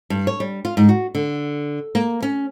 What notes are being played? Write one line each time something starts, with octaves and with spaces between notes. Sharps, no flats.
G2
C#5
G3
F4
G#2
F#4
D3
A#3
C#4